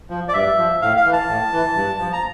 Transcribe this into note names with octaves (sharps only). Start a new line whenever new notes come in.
F3
D5
G2 E5
F3
A2 F5
F5
E3
A5
A2
E3
G2
F3
A#5